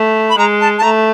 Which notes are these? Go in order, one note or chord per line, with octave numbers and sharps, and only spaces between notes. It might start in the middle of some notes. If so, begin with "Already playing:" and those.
Already playing: A3
B5
G#3 A#5
A5
A5
A3 A#5